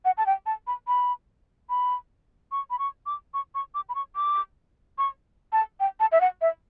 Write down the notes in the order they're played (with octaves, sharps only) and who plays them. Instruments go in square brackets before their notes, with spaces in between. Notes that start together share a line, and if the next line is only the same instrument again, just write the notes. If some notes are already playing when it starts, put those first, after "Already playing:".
[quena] F#5
A5
G5
A5
B5
B5
B5
C#6
B5
C#6
D6
C#6
C#6
D6
B5
C#6
D6
C#6
A5
G5
A5
E5
F#5
E5